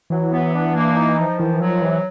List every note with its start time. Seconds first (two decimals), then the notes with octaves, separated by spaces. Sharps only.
0.10 E3 F#3
0.32 B3
0.54 D4
0.75 A#3
0.96 D#4
1.18 F3
1.38 D#3 E3
1.61 F3 F#3
1.82 C3 E3